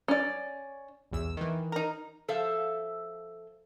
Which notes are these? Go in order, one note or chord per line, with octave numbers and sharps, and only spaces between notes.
C#4 D5
B1 E2 E6
D#3 E3
D#4 A#4
F3 A4 C5 E5 F5